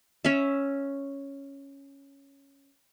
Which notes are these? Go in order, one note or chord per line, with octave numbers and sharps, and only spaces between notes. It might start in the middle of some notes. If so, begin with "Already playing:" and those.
C#4 E5